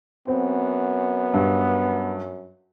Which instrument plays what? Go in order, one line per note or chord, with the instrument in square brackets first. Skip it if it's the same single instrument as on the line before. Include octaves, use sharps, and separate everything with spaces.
[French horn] F#2 [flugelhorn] B3 [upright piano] C4
[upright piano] G2